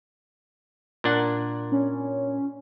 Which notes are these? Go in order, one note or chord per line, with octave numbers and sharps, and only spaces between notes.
A#2 D4 F#5
C#4